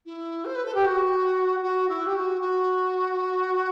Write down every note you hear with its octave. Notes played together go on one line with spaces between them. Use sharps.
E4
C5
B4
A4
G4
F#4
F#4
E4
G4
F#4
F#4